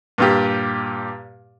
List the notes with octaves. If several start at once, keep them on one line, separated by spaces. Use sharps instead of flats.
G2 A#2 G4